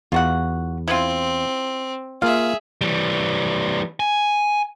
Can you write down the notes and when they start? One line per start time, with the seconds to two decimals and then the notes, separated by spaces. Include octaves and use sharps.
0.12 E2 F4 F#4 F#5
0.88 C4 E4 F4
2.22 A#3 F4 G#4 E5 F5
2.81 E3 G3
4.00 G#5